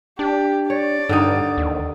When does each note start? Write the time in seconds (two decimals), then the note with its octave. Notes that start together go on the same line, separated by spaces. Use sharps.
0.19 D4 G4
0.70 C#5 D5
1.09 G2 D3 D#3 D#4
1.58 D#2